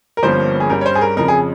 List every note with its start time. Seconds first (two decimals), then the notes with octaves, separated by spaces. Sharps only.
0.17 A#4
0.23 G1 G2 F3 A#3 C#4 C5
0.60 G#4
0.70 G2 G3 C#4 A#4
0.81 C#5
0.86 C5
0.95 G#4
1.01 A#4
1.17 F2 C#3 F3 A#4
1.28 G#4